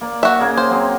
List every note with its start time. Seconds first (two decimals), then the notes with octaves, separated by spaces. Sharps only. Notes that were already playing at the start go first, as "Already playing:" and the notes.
0.01 A#3 D5
0.23 F#4 E5
0.39 C#3 A#3 G#4
0.57 C5
0.70 F#3 C4 G#4